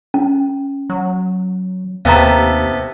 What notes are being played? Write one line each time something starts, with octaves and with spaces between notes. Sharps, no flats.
C#4
F#3
D#2 C3 B3 A4 F5 A#5